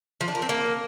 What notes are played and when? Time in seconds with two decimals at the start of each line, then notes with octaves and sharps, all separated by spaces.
0.21 F3
0.28 D4
0.35 A#4
0.42 C4
0.49 A#3